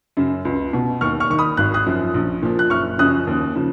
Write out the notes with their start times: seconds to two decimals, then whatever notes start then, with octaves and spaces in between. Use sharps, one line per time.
0.17 F#2 C#3
0.45 C#2
0.73 B2
1.01 D#2 C#6 F6
1.20 C#6 F6
1.30 D#3 C#6
1.39 B5 D#6
1.57 G#1 F#6
1.74 D#6 F#6
1.86 F#2 F3
2.14 A#1
2.43 A#2 F3
2.59 F#6
2.70 F#1 C#6 F6
2.98 F#2 C#3 F3 D#6 F#6
3.27 D#2
3.55 C#3 F3